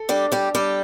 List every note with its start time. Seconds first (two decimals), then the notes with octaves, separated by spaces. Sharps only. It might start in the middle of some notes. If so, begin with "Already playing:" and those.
Already playing: A4
0.09 G3 D4 G4
0.32 G3 G4
0.55 G3 D4 G4